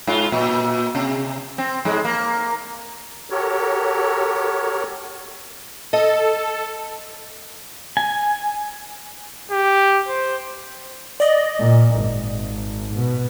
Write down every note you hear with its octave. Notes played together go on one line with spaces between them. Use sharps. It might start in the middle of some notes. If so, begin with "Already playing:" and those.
G#2 F4
A#2
C3
C4
G#2 G#3
A#3
F#4 G4 A4 A#4 C#5
A4 D#5
G#5
G4
C5
D5 D#5
A#2
G#1
B2